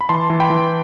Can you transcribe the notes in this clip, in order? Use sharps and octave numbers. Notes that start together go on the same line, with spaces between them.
B5
E3 A5 C6
E3
G5 B5
E3